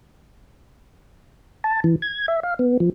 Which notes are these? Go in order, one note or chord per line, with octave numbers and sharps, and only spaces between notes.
A5
E3
G#6
E5
F5
B3
F3